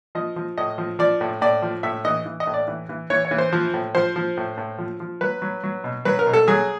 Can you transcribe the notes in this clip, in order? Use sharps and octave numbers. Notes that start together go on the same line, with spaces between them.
F3 D#5
F3
A2 D#5
F3
F3 D5
A2
A2 D5
F3
A2 E5
E3 D#5
E3
D#5
A2
D5
E3
E3
E3 C#5
C#5
E3
C5
F3
A2
F3 C5
F3
A2
A2
F3
F3
F#3 B4
F#3
F#3
B2
F#3 B4
A#4
B2
A4
F#3 G#4